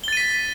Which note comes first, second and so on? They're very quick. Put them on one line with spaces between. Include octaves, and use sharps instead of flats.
G7 A6 D#7 B6